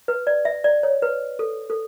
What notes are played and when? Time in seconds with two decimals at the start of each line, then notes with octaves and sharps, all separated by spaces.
0.08 B4
0.27 D5
0.45 E5
0.64 D5
0.83 C#5
1.02 B4
1.39 A4
1.70 A4